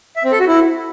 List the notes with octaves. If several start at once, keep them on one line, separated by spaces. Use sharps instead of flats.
E5
C4
A4
F#4
E4